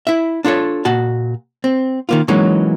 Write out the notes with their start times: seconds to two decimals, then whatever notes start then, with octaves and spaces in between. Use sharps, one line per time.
0.07 E4 E5
0.45 D4 F4 A4 C#5
0.85 A#2 F#4 A5
1.64 C4
2.09 D#3 A#3 F4
2.28 E3 F#3 G#3 A#3 C#4 D#4